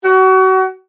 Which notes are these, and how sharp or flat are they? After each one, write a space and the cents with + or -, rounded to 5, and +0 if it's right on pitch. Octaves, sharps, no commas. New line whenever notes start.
F#4 +30